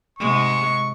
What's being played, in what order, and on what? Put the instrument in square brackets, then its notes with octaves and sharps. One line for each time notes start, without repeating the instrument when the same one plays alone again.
[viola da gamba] G#2 C3 G#3 [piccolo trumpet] C#6